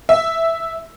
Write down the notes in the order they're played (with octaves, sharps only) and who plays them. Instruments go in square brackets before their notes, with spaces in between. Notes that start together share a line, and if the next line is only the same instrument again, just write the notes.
[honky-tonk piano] E5